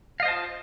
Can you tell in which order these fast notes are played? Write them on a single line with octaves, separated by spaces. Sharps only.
F5 D#5 C5 A5 F4